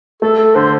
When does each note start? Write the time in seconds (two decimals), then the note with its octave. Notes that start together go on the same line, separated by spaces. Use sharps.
0.22 A3 A4
0.38 A4
0.55 D3 C5